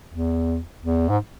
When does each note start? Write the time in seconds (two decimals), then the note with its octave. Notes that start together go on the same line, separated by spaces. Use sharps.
0.10 E2
0.82 E2
1.09 G#2